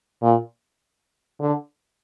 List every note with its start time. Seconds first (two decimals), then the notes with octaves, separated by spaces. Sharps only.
0.22 A#2
1.41 D3